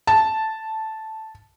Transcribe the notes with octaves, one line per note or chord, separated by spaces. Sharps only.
A5